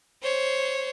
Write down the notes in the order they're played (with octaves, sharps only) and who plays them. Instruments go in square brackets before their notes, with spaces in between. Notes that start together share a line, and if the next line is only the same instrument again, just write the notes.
[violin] C5 C#5